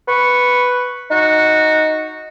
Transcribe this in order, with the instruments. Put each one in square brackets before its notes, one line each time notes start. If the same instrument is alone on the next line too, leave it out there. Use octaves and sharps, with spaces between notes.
[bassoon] B4 [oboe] C#6
[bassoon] D#4 [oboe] F#4